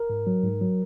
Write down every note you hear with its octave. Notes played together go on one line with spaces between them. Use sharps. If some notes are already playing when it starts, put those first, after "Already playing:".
Already playing: A#4
G#2
F#3
G#2
F#3